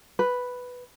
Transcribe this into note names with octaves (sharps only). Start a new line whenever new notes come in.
B4